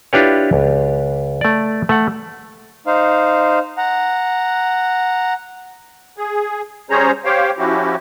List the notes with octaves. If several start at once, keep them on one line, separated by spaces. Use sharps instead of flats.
D4 E4 F4 G4 B4 C#5
C#2
A3 D5
A3 F#5
D#4 C5 F5
F#5 A#5
G#4
G3 C#4 G#4 C5 C#5 A#5
G4 C5 C#5 F5 G5
F3 C#4 E4 F#4 G4